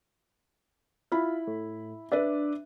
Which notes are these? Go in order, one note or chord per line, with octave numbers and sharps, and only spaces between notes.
E4 F4 B5
A2
D4 B4 D5 E5